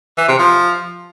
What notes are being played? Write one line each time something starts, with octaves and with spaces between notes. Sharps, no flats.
E3
C3
F3